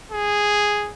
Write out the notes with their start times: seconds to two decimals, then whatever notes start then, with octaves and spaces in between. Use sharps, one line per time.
0.12 G#4